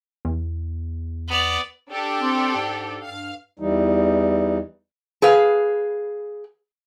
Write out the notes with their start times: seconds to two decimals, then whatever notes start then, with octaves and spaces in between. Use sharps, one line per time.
0.25 E2
1.28 B3 D5
1.90 D4 G4 A4
2.21 C4
2.56 G#2
3.05 G2 F5
3.59 E2 E3 G3 D#4
5.22 G#4 B4 F5